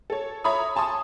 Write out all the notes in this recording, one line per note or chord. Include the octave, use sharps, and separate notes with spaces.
A4 C#5
C#5 E5 A#5 B5 C#6 D#6
G#5 A5 C6 C#6 D#6